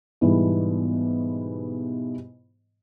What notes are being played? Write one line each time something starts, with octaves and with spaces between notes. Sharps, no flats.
G#2 B2 E3 G3